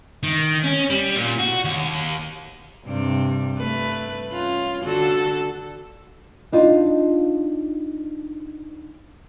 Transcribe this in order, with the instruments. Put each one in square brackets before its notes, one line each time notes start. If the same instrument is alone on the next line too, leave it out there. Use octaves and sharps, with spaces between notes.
[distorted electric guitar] D#3
C#4
G3
A#2
F#4
D#2
[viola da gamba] G2 C3 G3
A3 B4
C#4 F4
D3 F#4 A4
[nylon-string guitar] D4 D#4 F4